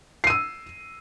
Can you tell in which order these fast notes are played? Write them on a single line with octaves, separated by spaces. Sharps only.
C7 D#7 E6